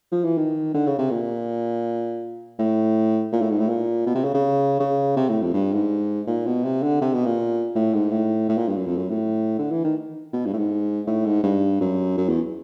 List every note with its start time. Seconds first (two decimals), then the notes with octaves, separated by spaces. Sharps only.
0.12 F3
0.25 E3
0.38 D#3
0.74 D3
0.87 C#3
0.98 C3
1.11 A#2
2.59 A2
3.33 A#2
3.42 A2
3.51 G#2
3.59 A2
3.69 A#2
4.07 B2
4.15 C3
4.24 C#3
4.34 C#3
4.80 C#3
5.16 C3
5.29 A2
5.42 F2
5.54 G2
5.73 G#2
6.27 A#2
6.46 B2
6.64 C3
6.83 D3
7.02 C3
7.14 B2
7.26 A#2
7.75 A2
7.94 G#2
8.11 A2
8.49 A2
8.58 A#2
8.68 G2
8.76 F#2
8.86 F2
8.98 F#2
9.10 A2
9.59 D3
9.71 E3
9.84 D#3
10.33 B2
10.46 G2
10.53 A2
10.58 G#2
11.07 A2
11.26 G#2
11.44 G2
11.81 F#2
12.18 F#2
12.29 E2